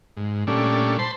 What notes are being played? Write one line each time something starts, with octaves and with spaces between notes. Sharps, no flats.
G#2
A#2 G3 A3 C#4 D4
C5 A5 B5 C6